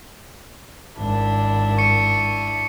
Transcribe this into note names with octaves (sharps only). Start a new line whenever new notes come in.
G#1 D4 E4
C#6 C#7 D#7